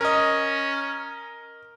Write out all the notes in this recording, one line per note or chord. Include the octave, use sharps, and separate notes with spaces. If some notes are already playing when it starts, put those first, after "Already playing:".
C#4 A#4 D#5